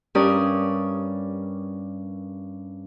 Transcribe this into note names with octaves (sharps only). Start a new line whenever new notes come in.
G2 C#4 G4 A#4 D5 D#6